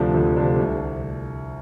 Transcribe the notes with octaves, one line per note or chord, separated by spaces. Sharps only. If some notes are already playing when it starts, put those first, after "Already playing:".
Already playing: D2 C3 F3 A3 D4
D2
C3 F3 A3 D4
C2